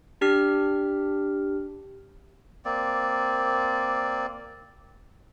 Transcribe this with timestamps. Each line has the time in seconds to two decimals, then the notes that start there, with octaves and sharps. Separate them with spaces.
0.21 D4 G4 F6 B6
2.65 A#3 C4 D5